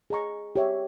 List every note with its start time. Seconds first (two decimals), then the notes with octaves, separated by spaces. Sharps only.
0.10 G#4 D#5 A#5 C#6
0.56 G4 C#5 E5